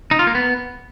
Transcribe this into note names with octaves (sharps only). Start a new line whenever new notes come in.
D#4
F4
A#3
B3